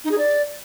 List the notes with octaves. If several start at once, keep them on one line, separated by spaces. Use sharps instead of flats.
D#4
G#4
D5